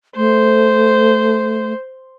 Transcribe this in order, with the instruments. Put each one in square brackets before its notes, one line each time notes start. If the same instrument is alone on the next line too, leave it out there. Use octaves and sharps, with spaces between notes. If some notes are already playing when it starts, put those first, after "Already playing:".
[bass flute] A3 [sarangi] C5